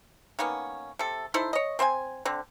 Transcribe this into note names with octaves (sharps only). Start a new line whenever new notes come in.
D#3 A#3 B3 C#4
C3 A4
D#4 E4 A4 C5
C#5 D#5
C4 C5 E5 G#5
D3 C4